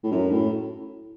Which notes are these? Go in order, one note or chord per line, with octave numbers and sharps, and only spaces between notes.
A2
F#2
A2